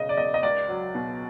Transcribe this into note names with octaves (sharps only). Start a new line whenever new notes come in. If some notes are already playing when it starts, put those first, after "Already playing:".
Already playing: E1 C#3 D#5
D5
E2 D#5
D#5
C#2 D5
F#3
B2